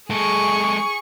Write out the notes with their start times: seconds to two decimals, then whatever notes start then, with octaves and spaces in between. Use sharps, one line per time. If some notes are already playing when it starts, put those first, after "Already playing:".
0.10 G#3 G#4 A4 C#6